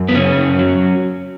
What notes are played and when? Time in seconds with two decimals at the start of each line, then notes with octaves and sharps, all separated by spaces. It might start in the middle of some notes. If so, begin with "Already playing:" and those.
Already playing: F#2
0.08 B3
0.15 C#3 C#4
0.37 F#2
0.59 F#3